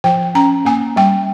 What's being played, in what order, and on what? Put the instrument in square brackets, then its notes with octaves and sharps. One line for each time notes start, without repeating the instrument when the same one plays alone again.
[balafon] F3 G5
C#4 A#5
A#3 G#5
G3 G5